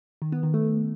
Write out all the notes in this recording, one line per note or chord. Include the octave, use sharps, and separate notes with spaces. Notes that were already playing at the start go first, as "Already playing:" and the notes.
D#3
B3
D#3
A3